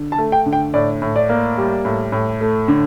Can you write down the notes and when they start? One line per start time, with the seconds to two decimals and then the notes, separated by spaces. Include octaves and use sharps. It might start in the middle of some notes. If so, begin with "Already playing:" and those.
Already playing: D3
0.12 A5
0.18 A3
0.32 G5
0.46 D3
0.53 G5
0.74 A2 D5
1.02 A2
1.16 D5
1.29 A#3
1.58 G3
1.85 A2
2.12 A2
2.41 A3
2.68 D3